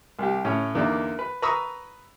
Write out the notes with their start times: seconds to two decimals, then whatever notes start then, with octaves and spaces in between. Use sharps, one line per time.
0.19 C2 G4
0.45 A2 C#4
0.75 E2 D3 D#3 A#3 D5
1.19 B4
1.42 B4 A#5 C#6 D#6 E6